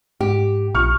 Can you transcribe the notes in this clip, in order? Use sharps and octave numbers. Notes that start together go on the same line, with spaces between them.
G#2 G4
A#1 C#6 F6